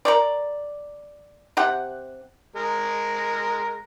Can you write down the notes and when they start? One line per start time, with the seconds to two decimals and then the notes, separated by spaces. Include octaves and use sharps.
0.05 A#4 C#5 D5
1.57 C3 G4 F#5
2.56 G#3 A#4